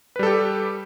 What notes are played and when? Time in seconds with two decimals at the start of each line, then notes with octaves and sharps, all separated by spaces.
0.16 B4
0.19 G3
0.23 A4
0.26 G4